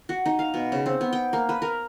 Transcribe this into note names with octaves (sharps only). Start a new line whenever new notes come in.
F#4
D#4
F5
B2
C#3
C4
B3
G5
A#3
B4
A#4